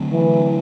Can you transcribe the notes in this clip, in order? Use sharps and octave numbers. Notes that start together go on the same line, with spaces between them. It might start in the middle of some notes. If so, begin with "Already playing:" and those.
Already playing: D3 F#3 A3 C4
E3